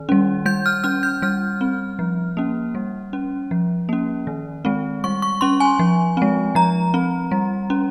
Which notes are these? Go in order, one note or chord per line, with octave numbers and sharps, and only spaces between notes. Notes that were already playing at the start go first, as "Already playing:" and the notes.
Already playing: D#3
G3 C#4
G3 G6
F6
C#4 F6
G6
G3 F6
C4
F3
A#3 C#4
G3
C#4
F3
A#3 C#4
D#3
G#3 C4
G3 C#6
C#6
C#4 C6
G#5
F3
G#3 C4
F3 A#5
C4
G3
C#4